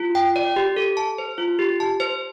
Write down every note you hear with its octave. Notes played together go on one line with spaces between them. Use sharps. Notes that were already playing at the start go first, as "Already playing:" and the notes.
Already playing: F4
G5
D5
G4
A4
A5
C5
F4
G4
A5
C5